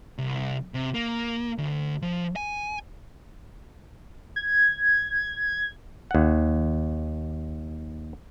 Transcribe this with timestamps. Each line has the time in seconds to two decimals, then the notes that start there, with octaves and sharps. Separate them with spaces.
0.18 C2
0.74 C3
0.94 A#3
1.58 D2
2.02 F3
2.36 G#5
4.36 G#6
6.11 D#2 F#5